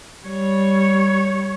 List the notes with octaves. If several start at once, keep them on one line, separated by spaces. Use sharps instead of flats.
G3 C#5